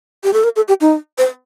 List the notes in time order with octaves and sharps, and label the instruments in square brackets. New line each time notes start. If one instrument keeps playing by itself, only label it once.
[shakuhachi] G4
A4
A#4
A4
G4
D#4
C5